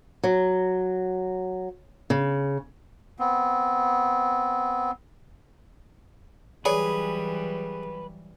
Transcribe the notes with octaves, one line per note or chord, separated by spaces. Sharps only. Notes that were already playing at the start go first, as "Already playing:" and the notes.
F#3
C#3
B3 C4
E3 F#3 G3 G#4 B4 C#5 D5